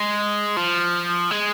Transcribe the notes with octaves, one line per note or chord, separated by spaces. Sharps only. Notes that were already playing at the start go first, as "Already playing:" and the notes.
Already playing: G#3
F3
G#3